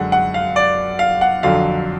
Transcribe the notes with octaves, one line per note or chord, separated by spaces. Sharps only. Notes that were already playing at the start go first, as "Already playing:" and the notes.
Already playing: F#2 D3 G#3 F#5
F#5
F5
D5
F5
F#5
F2 D3 F#3 F5